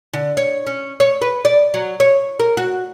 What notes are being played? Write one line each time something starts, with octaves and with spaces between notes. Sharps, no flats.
D3
C#5
C#4
C#5
B4
D5
F#3
C#5
A#4
F#4